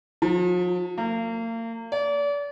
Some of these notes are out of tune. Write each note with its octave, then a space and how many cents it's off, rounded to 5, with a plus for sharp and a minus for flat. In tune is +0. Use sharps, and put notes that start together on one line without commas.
F3 +45
A#3 -35
D5 -35